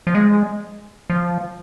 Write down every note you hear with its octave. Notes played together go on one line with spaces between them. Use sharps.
F3
G#3
F3